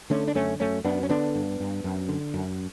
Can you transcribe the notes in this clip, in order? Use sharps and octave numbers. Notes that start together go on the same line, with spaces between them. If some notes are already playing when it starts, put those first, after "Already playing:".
D3 A3 C#4
D4
F#2 A3 C#4
F#2 A3 C#4
F#2 B3 D4
C#4
D3 B3 D4
G2
G2
F#2
D3
F#2